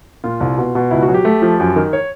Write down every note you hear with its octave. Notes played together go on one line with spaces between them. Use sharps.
A#2 F4
C2
B2
B2
C#2 E4
F#4
F#3
G4
A3
F3
F#2
D#3
C#5